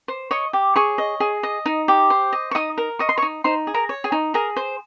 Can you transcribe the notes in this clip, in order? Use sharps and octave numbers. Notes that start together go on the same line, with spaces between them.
C5
C#5 D#5 C#6
G4
G#4 C#5 C#6
D#5
G#4
D#5
D#4
G4
C5
D#5
C#6
D#4 D#5 D#6
A#4
D#5 C#6
C6
C#5 C#6
D#4
D#4 C5 C6
G#4
A#4 A#5
C#5
G#4 G#5
D#4
G#4 A#4 A#5
C5